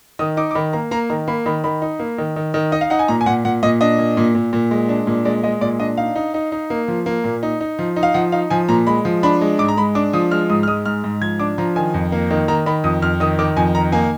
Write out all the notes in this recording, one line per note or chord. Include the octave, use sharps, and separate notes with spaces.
D#3 D#6
D#4 D6
D6
D#3 B5
A#3 A#5
A#3 A#5
D#3 A#5
A#3 B5
D#3 B5
D#3 B5
D#4
A#3
D#3
D#3
D#3
D#4 D#5
F5
D#4 F#5
G#5
A#2 A#5
G#5
A#2 F#5
A#2 F#5
A#2 D#5
D4 D#5
A#2
A#2
A#2
A#2
G#3
D4
A#2
G#3 D5
G#3 D#5
A#2 D5
D4 D#5
D#4 F5
D#4
D#4
D#4
A#3
F3
A#3
A#2
D#4
D#4
F3
D#4
F5
F3 F#5
D#4 F5
F3 G#5
A#2 A#5
G#3 B5
F3
D4 B5
G#3
G#2 D6
A#5
G#3 B5
D4 D6
F3 D#6
G#3 F6
G#2 D#6
F6
G#3 D#6
G#2 F6
G#2
F3 G#6
D4 D6
F3 A#5
D#3 G#5
F2
A#3
D#3
D#3 A#5
D#3 B5
F2 D#6
F2 F6
D#3 D#6
D#3 D6
F2 G#5
D#3 A#5
A#3 G#5